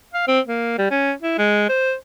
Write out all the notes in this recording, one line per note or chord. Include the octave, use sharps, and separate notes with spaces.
F5
C4
A#3
G3
C#4
E4
G#3
C5